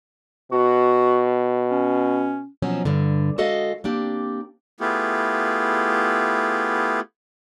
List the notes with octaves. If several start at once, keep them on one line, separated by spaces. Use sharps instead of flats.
B2 F#4
C#4
B2 F3 F#3 C4 C#4
G2 D3
G#3 F#4 A4 D#5 F5
A#3 C4 D4 G4
A3 B3 E4 F4 G4 G#4